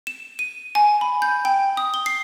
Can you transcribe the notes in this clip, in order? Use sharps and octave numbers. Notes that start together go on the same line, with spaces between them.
E7
D#7
G#5
B5
G6
G5
D#6
G7
C7